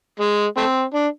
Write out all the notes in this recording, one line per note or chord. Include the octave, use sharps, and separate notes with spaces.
G#3
A3 C4
D4